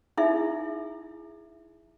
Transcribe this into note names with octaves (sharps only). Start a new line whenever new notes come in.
D#4 E4 G#4 E5